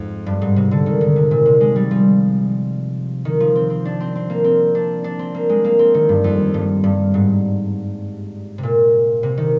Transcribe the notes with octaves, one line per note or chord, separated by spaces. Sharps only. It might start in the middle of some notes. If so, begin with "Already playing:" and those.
Already playing: F2 G#2
G2
G#2
C3
D3
D#3
D#3
C3
A#2
C3
G#3
G3
F3
D#3
F3
C4
C4
D4
C4
C4
A#3
C4
D4
D4
C4
A#3
G#3
A#3
C4
D#3
G2
F2
G2
G2
G#2
C3
A#2
C3
D#3